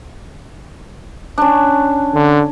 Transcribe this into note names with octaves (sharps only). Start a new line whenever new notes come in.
C#4 D4
D3